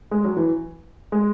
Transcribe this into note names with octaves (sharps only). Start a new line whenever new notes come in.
G#3
F#3
E3
G#3